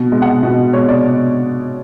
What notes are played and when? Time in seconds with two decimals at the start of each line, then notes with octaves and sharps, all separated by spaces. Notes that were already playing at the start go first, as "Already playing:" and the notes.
Already playing: B2
0.12 G#3
0.22 F#5
0.42 B2 D#5
0.73 G#3 C#5
0.89 D5